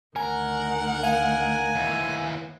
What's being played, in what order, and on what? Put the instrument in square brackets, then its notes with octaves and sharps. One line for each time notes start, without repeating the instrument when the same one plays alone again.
[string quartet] D2 D#3 F#5 [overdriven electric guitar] A#4 [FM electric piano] G#5
[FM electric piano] F5 [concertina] G#5
[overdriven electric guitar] D#2 E3